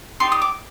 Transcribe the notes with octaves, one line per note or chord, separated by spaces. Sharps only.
D#4 G4 D5 C6
D#6
D6